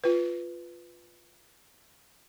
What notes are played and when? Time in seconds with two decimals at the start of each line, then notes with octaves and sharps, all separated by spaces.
0.04 F4 B4